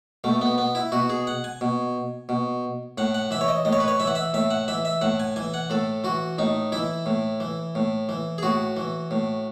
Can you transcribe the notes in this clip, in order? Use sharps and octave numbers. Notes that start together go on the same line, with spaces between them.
B2 A3
B3
B3
E4
B2 F#4
G#4
F#5
G#5
B2
B2
A2 F#5
F#5
E3 E5
C#5
D#5
A2 D#5
C#5
B4
C#5
E3 E5
F#5
E5
A2 E5
F#5
E3 E5
E5
A2 F#5
G#5
E3 G#5
F#5
A2 A4
E3 F#4
A2 D#4
E3 E4
A2
E3
A2
E3
G#4
A2 F#4
E3
A2